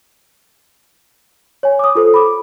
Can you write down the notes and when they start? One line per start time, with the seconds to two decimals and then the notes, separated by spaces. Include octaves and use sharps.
1.63 C#5 G#5
1.79 D6 D#6
1.95 F4 A4 C5
2.14 B5 D6